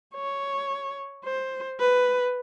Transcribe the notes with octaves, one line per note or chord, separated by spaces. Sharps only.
C#5
C5
B4